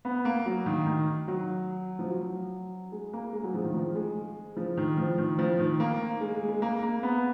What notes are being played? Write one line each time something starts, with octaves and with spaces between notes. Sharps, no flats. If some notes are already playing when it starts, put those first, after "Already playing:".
B3
A#3
F#3
D#3
D#3
F#3
F3
F#3
G#3
A#3
G#3
F#3
F3
D#3
F3
G#3
F3
D#3
F3
D#3
F3
D#3
A#3
G#3
G#3
G#3
A#3
A#3
B3